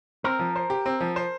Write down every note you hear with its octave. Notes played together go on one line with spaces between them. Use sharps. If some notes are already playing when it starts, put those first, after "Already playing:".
C4 A#4
F3
C5
G4
C4
F3
C5